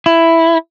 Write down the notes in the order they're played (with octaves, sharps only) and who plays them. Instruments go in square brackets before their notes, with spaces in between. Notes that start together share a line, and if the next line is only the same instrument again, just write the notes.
[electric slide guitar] E4